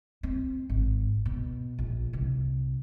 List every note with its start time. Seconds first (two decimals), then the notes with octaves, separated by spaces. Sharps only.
0.23 C4
0.69 G#1
1.26 B2
1.78 A#1
2.13 C2